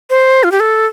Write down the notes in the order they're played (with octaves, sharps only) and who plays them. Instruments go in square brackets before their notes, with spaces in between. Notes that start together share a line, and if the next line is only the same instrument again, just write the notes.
[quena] C5
F4
G4
A4